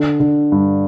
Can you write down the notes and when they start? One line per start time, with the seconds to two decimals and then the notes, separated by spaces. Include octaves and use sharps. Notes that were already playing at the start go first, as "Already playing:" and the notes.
Already playing: D3
0.20 D3
0.52 G2